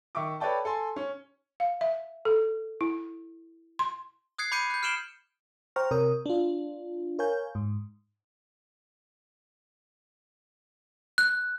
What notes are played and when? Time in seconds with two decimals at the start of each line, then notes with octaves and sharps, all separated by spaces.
0.15 D#3 E5 C#6 D6
0.40 A4 B4 C#5 D5 G5 A5
0.65 A4 G#5 C6
0.96 C#4
1.60 F5
1.81 E5
2.25 A4
2.81 E4
3.79 C6
4.39 D#6 F#6 G#6 C7 C#7
4.52 B5 D6 G6 C#7 D#7
4.70 F#6 G6
4.83 F6 C7 D7 E7 F#7 G7
5.76 C5 G5 A#5 C#6 F6 A#6
5.91 C3 A#4 C#5 D#6
6.26 D4 F4
7.19 A#4 C#5 F5 G#5 G6
7.55 G#2
11.18 F#6